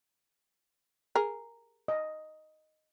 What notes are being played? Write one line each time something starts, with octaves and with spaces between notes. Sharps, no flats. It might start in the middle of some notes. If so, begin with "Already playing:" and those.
G#4 A#4
D#5